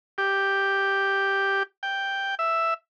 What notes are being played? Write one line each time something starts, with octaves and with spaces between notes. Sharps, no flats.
G4
G5
E5